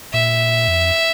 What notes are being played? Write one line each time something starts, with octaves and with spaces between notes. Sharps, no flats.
A#2 E5
F2